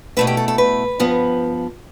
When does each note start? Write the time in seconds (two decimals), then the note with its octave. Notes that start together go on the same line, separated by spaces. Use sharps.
0.17 B2 A3 E4 B4
0.27 G4
0.37 A4
0.48 A4
0.58 B4
1.00 G2 F3 B3